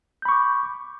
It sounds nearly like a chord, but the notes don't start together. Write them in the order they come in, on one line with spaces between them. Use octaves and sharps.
G6 B5 C#6 D6